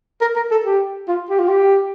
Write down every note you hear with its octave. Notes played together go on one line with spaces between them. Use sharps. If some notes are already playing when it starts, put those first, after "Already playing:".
A#4
A#4
A4
G4
F4
G4
F4
G4